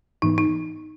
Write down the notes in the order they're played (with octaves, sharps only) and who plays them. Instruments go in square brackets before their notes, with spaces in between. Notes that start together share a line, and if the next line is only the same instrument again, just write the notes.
[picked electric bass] G#2 E3 B3 [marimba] D#4
[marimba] D#4